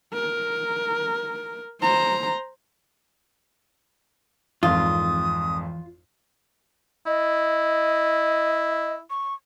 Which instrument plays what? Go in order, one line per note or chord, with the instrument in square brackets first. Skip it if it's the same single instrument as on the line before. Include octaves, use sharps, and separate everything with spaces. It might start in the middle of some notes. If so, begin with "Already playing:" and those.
[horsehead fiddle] A#4
C5 A#5
[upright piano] G#1 F2 [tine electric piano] E3 [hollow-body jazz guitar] F4 [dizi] D#6
[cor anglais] E4 [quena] D#5
[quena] C#6